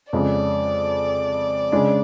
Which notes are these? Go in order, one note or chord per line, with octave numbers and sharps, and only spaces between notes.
F2 C#3 G#3 D5
C#3 G#3 D4